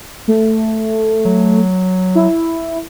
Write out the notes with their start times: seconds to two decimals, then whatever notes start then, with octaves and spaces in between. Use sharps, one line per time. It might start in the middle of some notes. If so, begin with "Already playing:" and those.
0.28 A3
1.25 F#3
2.15 E4